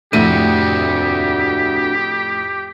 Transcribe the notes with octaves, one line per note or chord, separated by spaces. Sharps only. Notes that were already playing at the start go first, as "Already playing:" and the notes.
F2 A2 C3 A3 D4 F#4 G4 D#7